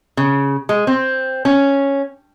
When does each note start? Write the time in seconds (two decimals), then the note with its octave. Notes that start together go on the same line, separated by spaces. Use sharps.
0.17 C#3
0.69 G#3
0.87 C4
1.45 C#4